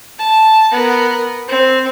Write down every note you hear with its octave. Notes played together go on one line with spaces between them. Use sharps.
A5
B3 A#4
C4